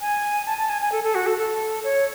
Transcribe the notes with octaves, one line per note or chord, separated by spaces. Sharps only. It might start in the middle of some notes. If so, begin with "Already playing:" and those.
G#5
A5
A5
G#5
G#5
A4
A4
F#4
A4
A4
C#5